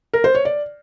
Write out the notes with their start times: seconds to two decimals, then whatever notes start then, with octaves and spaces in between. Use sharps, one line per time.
0.13 A#4
0.24 C5
0.35 C#5
0.45 D5